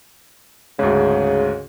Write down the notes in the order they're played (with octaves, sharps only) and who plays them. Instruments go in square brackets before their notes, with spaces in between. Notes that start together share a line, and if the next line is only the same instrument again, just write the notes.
[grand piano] D2 G#2 [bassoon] C#3